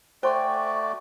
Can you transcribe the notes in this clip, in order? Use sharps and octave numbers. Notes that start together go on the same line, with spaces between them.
A3 F#4 C5 D5 G5 G#5 C6